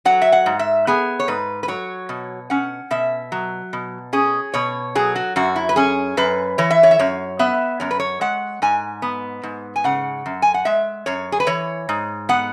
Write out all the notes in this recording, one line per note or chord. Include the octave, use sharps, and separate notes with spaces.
F#3 F#5
E5
F#5
G#2
E5
B3 G#4
C#5
G#2 B4
B4
F#3 C#5
B2
C#4 F#5
B2 E5
F#3
B2
C#4 G#4
B2 C#5
F#3 G#4
F#4
F#2 F#4
E4
B4
C#4 G#4
F#2 B4
E3 C#5
E5
C#5
E5
F#2 C#5
B3 E5
F#2 C#5
B4
C#5
G#3 F#5
G#2 G#5
B3
G#2
G#5
C#3 F#5
F#2
G#5
F#5
G#3 E5
F#2 C#5
G#4
B4
E3 C#5
G#2
B3 F#5